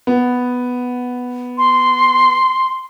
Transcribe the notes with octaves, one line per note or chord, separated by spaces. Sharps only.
B3
C6